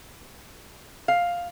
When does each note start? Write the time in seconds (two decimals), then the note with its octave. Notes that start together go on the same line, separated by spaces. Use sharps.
1.08 F5